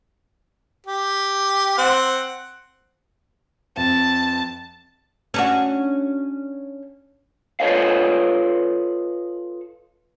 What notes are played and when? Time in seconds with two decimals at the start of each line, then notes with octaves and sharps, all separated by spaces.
0.87 G4
1.78 C4 F#5
3.77 F2 A5
5.34 C#4 D4 F#4
7.60 F4 A4 B4 C#5 D#5 F5